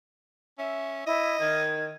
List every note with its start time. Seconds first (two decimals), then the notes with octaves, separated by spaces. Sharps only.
0.58 C#4 E5
1.06 E4 D#5
1.40 D#3 G#6